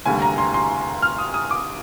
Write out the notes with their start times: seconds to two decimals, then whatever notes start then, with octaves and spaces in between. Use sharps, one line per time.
0.05 F1 D#2 D3 G3 G#5
0.22 A#5
0.38 C6
0.54 C6
1.03 F6
1.19 D#6
1.34 D#6
1.51 D6